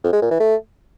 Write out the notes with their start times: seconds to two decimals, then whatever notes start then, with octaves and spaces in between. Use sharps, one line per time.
0.04 F2
0.13 G#3
0.22 A#2
0.31 E3
0.40 A3